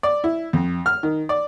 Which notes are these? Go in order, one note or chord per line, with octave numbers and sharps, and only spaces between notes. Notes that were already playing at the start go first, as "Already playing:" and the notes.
D5
E4
F2
F6
D#3
D5